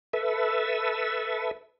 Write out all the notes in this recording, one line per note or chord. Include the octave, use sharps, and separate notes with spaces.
A4 B4 E5